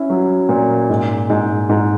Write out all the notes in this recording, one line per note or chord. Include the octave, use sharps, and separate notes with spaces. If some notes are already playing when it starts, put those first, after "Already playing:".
Already playing: C#4 E4
F#3
A#2
G#2
G#2
G#2